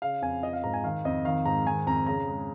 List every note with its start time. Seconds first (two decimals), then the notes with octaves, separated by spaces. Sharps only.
0.02 C#3 F5
0.22 F2 G#5
0.43 F3 D#5
0.53 F5
0.64 G#2 A#5
0.74 G#5
0.84 D#3 F5
1.05 F2 D#5
1.25 D#3 F5
1.45 G#2 A#5
1.66 D#3 G#5
1.87 F2 A#5
2.07 C#3 A#5
2.28 G#3